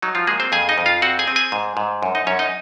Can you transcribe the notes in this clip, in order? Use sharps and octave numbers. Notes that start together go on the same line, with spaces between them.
F#3 D#4
F3 F4
G#3 A#3 G#4
C4 C5
F2 G#4 G#5
D#4 D#5
F2
F4 F5
C4 F#4 F#5
G#4 G#5
C4
G#4 G#5
G#2
G#2
F#2
D#4 D#5
F#2 C#4 C#5
D#4 D#5